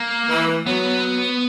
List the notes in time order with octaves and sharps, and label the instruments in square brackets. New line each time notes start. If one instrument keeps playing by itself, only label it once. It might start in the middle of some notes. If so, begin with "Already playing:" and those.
Already playing: [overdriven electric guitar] A#3
[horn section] E3
[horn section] F#3 [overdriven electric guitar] B3